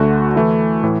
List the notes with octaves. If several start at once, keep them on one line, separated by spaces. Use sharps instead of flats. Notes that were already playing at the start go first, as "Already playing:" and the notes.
Already playing: D2 D3 A3 F#4
E3 A3 E4
A2 E3